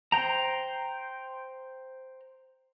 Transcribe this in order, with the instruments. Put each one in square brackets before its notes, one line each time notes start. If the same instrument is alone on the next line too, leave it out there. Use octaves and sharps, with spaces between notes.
[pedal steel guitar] C5 G5 A#5